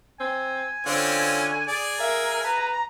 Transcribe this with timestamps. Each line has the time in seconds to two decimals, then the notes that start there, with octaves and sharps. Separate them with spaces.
0.21 C4 G#5
0.87 D3 C4 C#4 F4
1.67 G#4 D5
2.01 A#4 E5 F5
2.44 B4 A#5